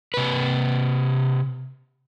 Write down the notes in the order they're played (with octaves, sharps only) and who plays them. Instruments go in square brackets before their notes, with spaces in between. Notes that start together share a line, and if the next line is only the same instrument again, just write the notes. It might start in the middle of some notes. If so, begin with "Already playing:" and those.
[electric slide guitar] C3 B4